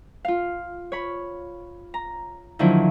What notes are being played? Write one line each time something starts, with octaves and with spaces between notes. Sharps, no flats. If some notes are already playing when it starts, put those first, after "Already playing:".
F4 F5
C#5 B5
A#5
D3 D#3 F3 F#3 D4 E4